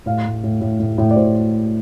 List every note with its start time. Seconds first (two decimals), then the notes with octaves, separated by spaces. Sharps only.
0.06 A2 F5
0.25 A2
0.43 A2
0.61 A2
0.80 A2
0.98 A2
1.11 D5
1.16 A2 C5